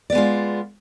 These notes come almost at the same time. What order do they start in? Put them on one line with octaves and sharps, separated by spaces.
D5 B3 G#3 F4